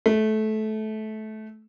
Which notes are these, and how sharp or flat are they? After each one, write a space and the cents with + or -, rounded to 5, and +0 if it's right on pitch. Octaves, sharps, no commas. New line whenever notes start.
A3 -20